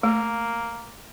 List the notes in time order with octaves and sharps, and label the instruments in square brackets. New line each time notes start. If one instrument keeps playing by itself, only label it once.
[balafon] A3 [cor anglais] A#3